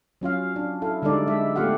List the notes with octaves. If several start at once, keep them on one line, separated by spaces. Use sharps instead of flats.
F#3 C#4 F4 F5
D4
E4 A4 F5
D3 G3 G#3 D#4 A4 D5
G#3 E5
A3 B3 F4 G4 F5 F#5